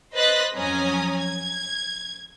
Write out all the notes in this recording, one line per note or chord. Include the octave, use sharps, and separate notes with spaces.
B4 C5 D#5 F#6 A6 B6
F2 F#3 C#4 G#5 A#5 D#6
G#6